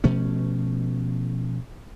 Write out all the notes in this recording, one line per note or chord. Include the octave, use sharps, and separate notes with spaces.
B2 F3 A3 C#4